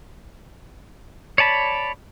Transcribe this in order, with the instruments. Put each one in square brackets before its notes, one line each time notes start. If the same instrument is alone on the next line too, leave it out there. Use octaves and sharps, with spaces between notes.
[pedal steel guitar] C#5 D5 A5 B5